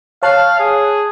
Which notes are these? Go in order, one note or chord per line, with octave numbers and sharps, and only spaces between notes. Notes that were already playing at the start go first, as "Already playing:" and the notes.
C#5 F5 A5 F#6
G#4